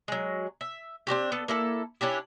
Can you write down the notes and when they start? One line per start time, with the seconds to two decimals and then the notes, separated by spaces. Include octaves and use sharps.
0.08 F#3 G#3
0.61 E5
1.07 C4 D4 F#4 G4
1.32 B3 A4
1.48 A#3 E4 A4
2.01 C#4 D4 E4 G4